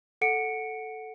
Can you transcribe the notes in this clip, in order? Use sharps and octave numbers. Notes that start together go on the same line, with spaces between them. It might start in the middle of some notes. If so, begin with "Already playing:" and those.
A4 F#5 C#7 D7